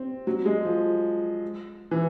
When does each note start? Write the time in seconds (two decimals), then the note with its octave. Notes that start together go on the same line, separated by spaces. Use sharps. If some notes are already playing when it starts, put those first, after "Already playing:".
Already playing: C4
0.27 F#3
0.45 G#3
0.65 F3
1.91 E3